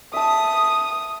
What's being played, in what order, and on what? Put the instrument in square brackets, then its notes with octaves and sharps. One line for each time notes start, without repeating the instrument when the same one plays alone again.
[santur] E5 A5 [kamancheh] D#6